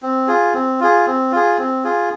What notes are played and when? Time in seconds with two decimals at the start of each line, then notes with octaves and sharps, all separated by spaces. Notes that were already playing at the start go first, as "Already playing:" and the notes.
0.02 C4
0.28 F4 G#4
0.54 C4
0.80 F4 G#4
1.06 C4
1.32 F4 G#4
1.58 C4
1.84 F4 G#4